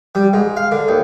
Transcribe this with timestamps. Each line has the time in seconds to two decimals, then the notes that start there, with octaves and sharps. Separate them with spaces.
0.15 G3
0.33 G#2
0.57 F5
0.72 D3
0.88 D#2